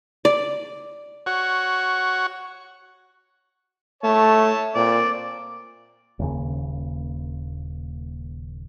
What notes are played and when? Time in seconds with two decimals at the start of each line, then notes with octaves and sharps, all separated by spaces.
0.25 D5
1.26 F#4 C#5 F#5
4.03 A3 C#5 A5
4.75 A#2 C4 D5
6.19 D#1 D#2 C#3